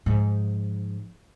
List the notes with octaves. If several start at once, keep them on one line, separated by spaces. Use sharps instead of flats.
G#2 F3